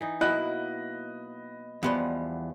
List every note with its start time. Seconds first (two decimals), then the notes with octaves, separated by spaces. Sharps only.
0.01 E3 D#4
0.21 B2 F#3 A#3 E4 D#5 B5 F#6
1.83 E2 F3 G3 B3 C6